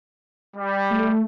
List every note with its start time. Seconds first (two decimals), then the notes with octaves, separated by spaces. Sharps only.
0.56 G3
0.91 A3